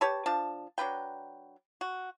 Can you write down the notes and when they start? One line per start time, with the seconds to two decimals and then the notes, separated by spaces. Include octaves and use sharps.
0.01 G4 B4 C#5 A5
0.26 F3 D4 A5
0.78 F#3 D4 B4 G5
1.81 F#4